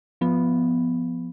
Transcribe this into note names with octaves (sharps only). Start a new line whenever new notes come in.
F3 B3